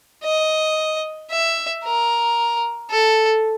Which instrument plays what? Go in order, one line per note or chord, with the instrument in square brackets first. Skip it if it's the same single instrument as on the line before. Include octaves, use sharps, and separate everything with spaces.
[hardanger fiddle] D#5
E5
A#4
A4